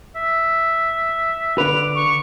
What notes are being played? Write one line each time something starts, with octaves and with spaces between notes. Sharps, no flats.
E5
D3 B4 D6 F7
C#6